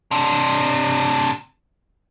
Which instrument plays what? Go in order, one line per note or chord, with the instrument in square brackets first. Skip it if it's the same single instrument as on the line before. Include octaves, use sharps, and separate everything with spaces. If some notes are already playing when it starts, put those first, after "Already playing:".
[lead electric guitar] C3 D4